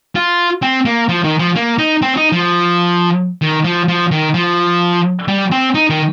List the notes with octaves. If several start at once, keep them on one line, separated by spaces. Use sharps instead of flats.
F4
C4
A#3
F3
D#3
F3
A#3
D#4
C4
D#4
F3
D#3
F3
F3
D#3
F3
G3
C4
D#4
D#3